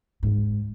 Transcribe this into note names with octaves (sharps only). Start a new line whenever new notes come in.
G#2